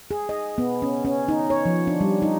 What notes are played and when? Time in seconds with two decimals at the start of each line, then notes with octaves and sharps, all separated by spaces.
0.11 G#4
0.29 D#5
0.58 B3
0.82 C#4
1.05 C#4
1.28 D#4
1.50 C#5
1.66 F3
1.87 D4
2.01 G3
2.22 D#4